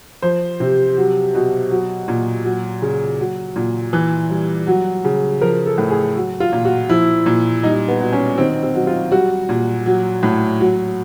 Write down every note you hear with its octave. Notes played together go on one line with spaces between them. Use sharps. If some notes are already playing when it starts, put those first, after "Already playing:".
F3 C5
C3
F#3
B2
F#3
A#2
F#3
C#3
F#3
A#2
E3
G3
F#3
C#3
F3 A#4
A4
A2
G#4
F#3
F4
A#2
F#4
F3 E4
A#2
G3 D#4
B3
B2
C#4
D#3 C4
C4
F#3
F4
G3 F#4
A#2
F#3
A2
F#3